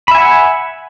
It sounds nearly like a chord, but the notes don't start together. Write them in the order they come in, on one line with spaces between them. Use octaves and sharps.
B5 E5 G#5 F#5